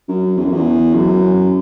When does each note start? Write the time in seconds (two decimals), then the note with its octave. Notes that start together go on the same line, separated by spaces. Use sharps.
0.08 F#2
0.37 E2
0.45 F#2
0.53 E2
0.94 F#2